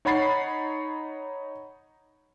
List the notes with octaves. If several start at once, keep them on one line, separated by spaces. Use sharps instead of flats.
D#4 C#5 F#5 B5 A6 C7